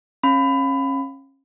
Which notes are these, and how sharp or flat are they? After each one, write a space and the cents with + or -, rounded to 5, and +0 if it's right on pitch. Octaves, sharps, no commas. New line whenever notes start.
C#4 -35 F5 +0 B5 +20